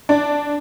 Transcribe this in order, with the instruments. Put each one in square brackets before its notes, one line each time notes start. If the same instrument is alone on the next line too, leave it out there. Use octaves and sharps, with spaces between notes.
[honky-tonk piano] D4